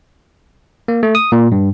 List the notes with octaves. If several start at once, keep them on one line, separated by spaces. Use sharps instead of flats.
A#3
A3
D#6
A#2
G2